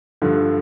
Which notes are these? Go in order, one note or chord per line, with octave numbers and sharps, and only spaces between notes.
G2 D3 F3 A3